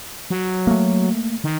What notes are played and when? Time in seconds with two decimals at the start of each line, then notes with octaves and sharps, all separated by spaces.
0.30 F#3
0.67 A3 A#3
1.44 D#3